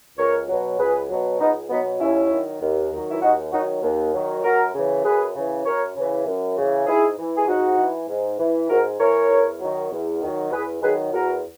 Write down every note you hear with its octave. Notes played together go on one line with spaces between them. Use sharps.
C#2 A#4 C#5
B2 F#3
C#2 G#4 B4
B2 F#3
C#2 B3 D#4
B2 F#3 B3 D#4
D#2 C#4 E4
D#3 F#3
D#2
D#3 F#3
E4
D#2 D#4 F#4
D#3 F#3 D#4 F#4
D#2
D#3 F#3
F#2 F#4 A#4
C#3 E3
F#2 G#4 B4
C#3 E3
F#2 A#4 C#5
C#3 E3
F#2
C#3 E3
G#2 E4 G#4
E3
G#4
G#2 D#4 F#4
E3
G#2
E3
G#2 F#4 A#4
E3 A#4 C#5
E2
D#3 F#3
E2
D#3 F#3
E2 G#4 B4
D#3 F#3 G#4 B4
E2 F#4 A#4